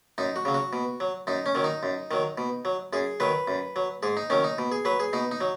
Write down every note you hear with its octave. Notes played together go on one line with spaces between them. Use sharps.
F#2 D#4
F#4
C#3 F#3
F#4
B2
F#3
F#2 D#4
C#4
D#3 F#3
D#4
F#2
D#3 F#3
B2
F#3
F#2 G#4
D#3 F#3 B4
F#2
F#3
G#2 G#4
D#4
D#3 F#3 C#4
D#4
B2
G#4
F#3 B4
G#4
B2 D#4
D#4
F#3